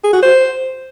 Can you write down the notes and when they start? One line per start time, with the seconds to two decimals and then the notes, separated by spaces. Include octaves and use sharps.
0.04 G#4
0.13 F#4
0.22 C5